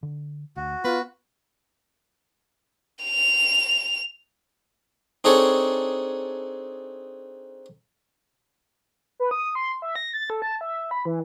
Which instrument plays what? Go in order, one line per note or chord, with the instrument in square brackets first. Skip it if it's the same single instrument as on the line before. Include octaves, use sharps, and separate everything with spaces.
[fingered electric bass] D3
[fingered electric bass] D2 [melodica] F#4
[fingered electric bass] B3 [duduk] F4 [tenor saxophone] B4
[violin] F7
[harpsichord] C4 D4 D#4 G#4 A4 C#5
[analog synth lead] B4
D#6
C6
E5
A#6
A6
A4
A5
E5
B5
E3